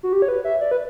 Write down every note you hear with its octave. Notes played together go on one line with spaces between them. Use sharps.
F#4
G4
C#5
B4
E5
D5
B4